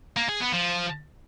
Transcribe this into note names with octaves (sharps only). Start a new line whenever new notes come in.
A#3
G#4
B3
F3